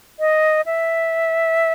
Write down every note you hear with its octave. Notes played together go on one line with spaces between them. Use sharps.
D#5
E5